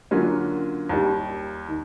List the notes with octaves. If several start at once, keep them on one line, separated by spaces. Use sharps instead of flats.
D3 F#3 A#3 C#4 F4
D#2 D#3 G3
D#3